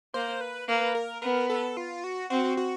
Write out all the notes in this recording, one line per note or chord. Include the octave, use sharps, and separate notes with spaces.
A#3 C5
B4
A#3 B4
A#4
B3 A#4
A4
F4
F#4
C4 F#4
F#4